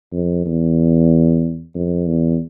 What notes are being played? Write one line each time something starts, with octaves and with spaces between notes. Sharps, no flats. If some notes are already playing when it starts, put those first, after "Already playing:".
F2
E2
F2
E2